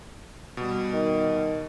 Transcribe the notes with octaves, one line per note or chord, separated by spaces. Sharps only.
B2 G3
D#3